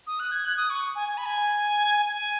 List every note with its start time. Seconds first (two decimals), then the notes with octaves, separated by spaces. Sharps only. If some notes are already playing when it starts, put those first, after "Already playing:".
0.07 D#6
0.20 F#6
0.32 G#6
0.45 F#6
0.57 D#6
0.70 C#6
0.95 G#5
1.08 G#5
1.17 B5
1.26 G#5
2.10 G#5